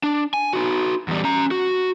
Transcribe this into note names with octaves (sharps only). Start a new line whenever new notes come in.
D4
G#5
D#4 F#4
E2 G3
C#4 A#5
F#4